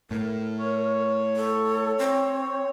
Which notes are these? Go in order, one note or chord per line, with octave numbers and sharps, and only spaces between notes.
A2 A3 A#4
C#5
A4
C4